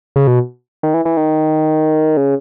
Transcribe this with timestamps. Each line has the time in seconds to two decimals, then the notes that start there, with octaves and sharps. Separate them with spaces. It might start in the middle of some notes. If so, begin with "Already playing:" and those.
0.16 C#3
0.27 B2
0.83 D#3
0.94 E3
1.05 E3
1.17 D#3
2.17 C#3